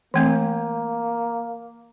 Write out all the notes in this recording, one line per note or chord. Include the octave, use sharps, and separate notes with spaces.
E3 A3 A#3 C4